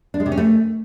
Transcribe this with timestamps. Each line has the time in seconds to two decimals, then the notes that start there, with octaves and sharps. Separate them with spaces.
0.14 D4
0.20 G#3
0.26 C3
0.32 C#4
0.37 A3